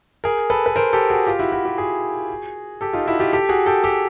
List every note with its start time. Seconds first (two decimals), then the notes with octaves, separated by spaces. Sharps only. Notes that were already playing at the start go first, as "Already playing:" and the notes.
0.24 G#4 A#4
0.50 A4 B4
0.66 B4
0.76 A#4 C5
0.93 G4 A4
1.10 F#4 G#4
1.27 F4 G4
1.39 E4 F#4
1.52 E4 F#4
1.65 F4 G4
1.78 F#4 G#4
2.81 G4 A4
2.93 D#4 F4
3.06 E4 F#4
3.20 F4 G4
3.32 G4 A4
3.49 F#4 G#4
3.66 G4 A4
3.84 G4 A4